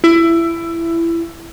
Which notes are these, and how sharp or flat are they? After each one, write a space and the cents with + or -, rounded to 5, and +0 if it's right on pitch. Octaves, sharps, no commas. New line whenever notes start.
E4 +20